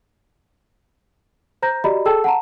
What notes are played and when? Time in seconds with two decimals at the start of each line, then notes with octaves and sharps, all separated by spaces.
1.62 C5 A#5 G6 A#6
1.84 F#4 G4 D5 D#5 A#5 B5
2.06 G#4 A4 G5 A5 E6
2.24 F#5 A5 A#5